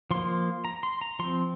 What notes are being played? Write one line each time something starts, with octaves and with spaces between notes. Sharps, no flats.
F3 A#3 C6
A#5
C6
A#5
F3 C4 C6